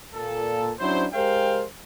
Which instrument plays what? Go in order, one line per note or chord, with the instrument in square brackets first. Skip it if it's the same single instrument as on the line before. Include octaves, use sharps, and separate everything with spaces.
[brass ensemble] A#2 A4
F#3 C#4 D4 E4 C5
G#3 G4 A#4 C5 F5 G5